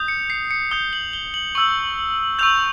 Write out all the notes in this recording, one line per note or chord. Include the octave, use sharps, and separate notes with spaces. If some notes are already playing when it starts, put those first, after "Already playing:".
Already playing: D#6 G6
C#7
C7
C#7
D#6 G6 G7
F#7
G7
F#7
C#6 E6 G6 F#7
C#6 E6 G6 F7